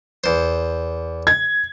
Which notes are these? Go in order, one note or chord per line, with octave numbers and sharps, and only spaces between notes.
E2 C5
G#6